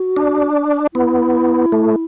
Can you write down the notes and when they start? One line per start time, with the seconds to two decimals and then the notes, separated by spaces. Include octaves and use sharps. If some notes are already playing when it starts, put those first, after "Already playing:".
Already playing: F#4
0.16 D4
0.94 B3 E4
1.72 A3